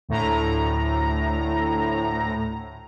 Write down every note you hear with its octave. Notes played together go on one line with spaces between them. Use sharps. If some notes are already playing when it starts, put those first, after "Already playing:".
D2 A2 A#5